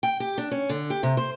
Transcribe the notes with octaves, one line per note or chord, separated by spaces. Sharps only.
G5
G4
D4
C#4
D3
G4
C3
C5